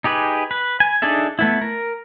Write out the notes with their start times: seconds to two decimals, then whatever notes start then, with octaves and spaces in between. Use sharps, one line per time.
0.04 D#4 G4 G#4 B4
0.51 B4
0.80 G#5
1.02 D4 D#4 G#4 A4 E5
1.39 A3 B3 E4
1.62 A#4